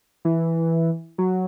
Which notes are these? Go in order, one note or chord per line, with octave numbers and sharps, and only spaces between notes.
E3
F#3